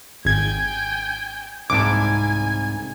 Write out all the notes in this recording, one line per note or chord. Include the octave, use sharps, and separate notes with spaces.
G#1 G5 G#5 G#6
C2 G#2 G#5 A5 D6